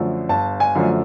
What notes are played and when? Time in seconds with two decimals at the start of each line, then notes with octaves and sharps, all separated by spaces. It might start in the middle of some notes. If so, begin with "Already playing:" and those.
Already playing: F#2 D3 F3 A3
0.29 G1 A5
0.60 G#5
0.75 F#2 D3 F3 A3